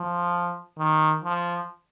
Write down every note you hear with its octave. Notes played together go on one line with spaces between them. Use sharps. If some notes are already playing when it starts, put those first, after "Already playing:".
Already playing: F3
D#3
F3